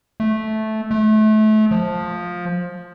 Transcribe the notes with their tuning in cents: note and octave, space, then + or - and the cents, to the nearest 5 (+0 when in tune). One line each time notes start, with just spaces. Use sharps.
A3 -10
A3 -30
F3 +15